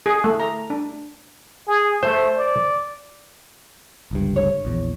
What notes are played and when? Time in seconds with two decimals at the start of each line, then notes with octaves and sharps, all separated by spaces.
0.06 G#4
0.24 A3
0.40 A#5
0.70 D4
1.67 G#4
2.03 A3 C5
2.37 D5
4.11 G1 C#2 G2
4.36 C#5
4.65 A#1 E2